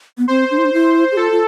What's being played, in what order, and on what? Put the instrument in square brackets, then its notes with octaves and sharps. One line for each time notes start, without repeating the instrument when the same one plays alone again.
[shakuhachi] B3
[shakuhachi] C4 [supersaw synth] C5
[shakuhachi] D4
E4
D4
E4
G#4
[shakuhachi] F4 [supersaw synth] A4
[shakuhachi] F4